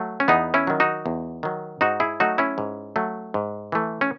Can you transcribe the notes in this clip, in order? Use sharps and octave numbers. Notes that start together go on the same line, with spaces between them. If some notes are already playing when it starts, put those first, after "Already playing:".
Already playing: F#3 A3
C#4
E2 B3 D#4
C#4 E4
D#3 F#3
D#4 F#4
E2
D#3 F#3
G#2 D#4 F#4
E4 G#4
F#3 A3 D#4 F#4
C#4 E4
G#2
F#3 A3
G#2
E3 A3
C#4